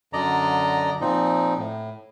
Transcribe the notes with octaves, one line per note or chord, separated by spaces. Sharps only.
F#2 D3 D5 D#5 A#5
A#2 F3 C4 D#4
A2